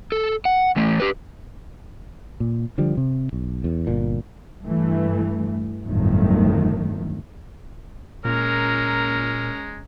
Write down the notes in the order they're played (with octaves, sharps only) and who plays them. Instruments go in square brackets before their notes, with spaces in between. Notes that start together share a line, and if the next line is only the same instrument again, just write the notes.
[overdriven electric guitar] A4
F#5
E3 A3
G4 B4
[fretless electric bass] A#2
D3 F3 G3
C3
B1
E2
G1 A#2
[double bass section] G2 E3 A3
G1 F2 A2 D#3 F#3 A3
[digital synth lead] A#2 [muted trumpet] G#3 [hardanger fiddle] C#4 A#5 [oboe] A#4